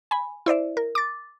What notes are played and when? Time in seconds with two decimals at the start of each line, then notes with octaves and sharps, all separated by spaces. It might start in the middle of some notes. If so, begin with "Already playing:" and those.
0.11 G#5 B5
0.46 E4 C5 D5 E5
0.77 A#4
0.95 D6 A6